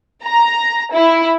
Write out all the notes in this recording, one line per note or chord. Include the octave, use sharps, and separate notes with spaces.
A#5
E4